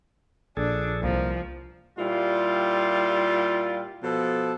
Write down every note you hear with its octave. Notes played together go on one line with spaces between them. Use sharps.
A#1 D4 G#4 A4
C2 F3 A#3
A#2 G3 E4 F4
B2 F3 A4